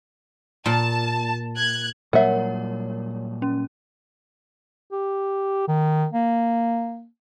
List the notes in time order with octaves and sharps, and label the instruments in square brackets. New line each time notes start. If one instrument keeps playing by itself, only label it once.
[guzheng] A#2 [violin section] A5
[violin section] F#6 G#6
[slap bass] A#2 F#3 G3 [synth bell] A#4 C#5 [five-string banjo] E5 F#5
[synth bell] C#4
[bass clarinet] G4
D#3
A#3